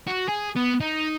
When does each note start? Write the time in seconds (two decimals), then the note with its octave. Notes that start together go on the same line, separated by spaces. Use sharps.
0.08 F#4
0.29 G#4
0.56 B3
0.80 D#4